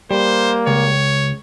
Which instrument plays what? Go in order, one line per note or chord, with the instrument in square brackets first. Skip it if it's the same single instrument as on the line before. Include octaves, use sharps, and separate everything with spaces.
[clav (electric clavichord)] G3 [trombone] A#3 [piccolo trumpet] C5
[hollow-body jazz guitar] C#2 [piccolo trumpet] C#5